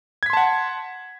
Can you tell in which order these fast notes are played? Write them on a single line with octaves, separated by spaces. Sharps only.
G#6 B6 C6 A5 F#5